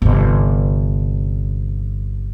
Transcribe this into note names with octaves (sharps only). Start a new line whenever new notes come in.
G1 C3